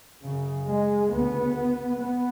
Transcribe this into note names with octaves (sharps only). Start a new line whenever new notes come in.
F#2 C#3
G#3
D2 C#3 B3
B3